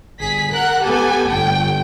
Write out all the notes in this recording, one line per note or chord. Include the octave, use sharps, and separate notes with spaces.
G1 G#4 B6
A#4 F#5 F#6
B3 G4 A4 G#5
G1 G5